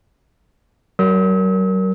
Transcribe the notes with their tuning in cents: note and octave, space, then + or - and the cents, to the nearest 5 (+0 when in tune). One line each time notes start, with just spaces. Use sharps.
F#3 +40 A#4 +0 E6 -45